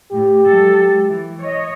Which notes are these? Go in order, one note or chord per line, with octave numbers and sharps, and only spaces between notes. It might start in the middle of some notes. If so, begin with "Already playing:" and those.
A2 G4
F#3 G#3 A4
E3
C#5 D#5